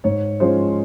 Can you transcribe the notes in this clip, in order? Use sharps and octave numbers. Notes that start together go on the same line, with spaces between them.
G#2 C#5
F3 G#3 C#4 F4 C5